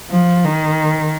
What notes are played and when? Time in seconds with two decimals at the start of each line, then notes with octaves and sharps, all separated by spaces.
0.11 F3
0.44 D#3